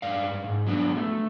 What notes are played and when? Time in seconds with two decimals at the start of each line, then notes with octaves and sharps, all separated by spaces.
0.02 G2 D5 F5
0.44 G#2
0.67 F#3 B3 D4
0.96 A3